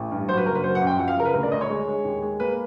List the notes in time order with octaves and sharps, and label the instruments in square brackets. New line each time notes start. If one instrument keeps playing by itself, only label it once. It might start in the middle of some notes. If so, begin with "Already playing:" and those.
Already playing: [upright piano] A1
G2
F#3 C5
B4
F#1 A#4
B4
F#3 C5
F#5
F#2
G5
F3 F#5
F5
C#3 A#4
B4
D2 A#4
D5
D2 D#5
C#5
G#3
G#3
D#2
G#3
A#3 B4